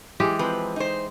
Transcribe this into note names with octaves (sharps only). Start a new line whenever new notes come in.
E3 G#3 G4
F3 C4 B4
D#4 C5